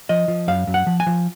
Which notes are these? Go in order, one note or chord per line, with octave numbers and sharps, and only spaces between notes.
F3 D#5
F3
F#2 F5
F#2
F#5
F3
G#5
F3